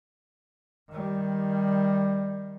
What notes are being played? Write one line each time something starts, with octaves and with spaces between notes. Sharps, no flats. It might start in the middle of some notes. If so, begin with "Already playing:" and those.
D#3 G3